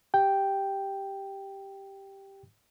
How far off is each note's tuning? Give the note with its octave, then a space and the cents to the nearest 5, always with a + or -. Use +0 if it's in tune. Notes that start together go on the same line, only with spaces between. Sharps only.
G4 +0 G5 +0